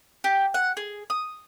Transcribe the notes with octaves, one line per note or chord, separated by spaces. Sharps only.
G4
F#5
G#4
D#6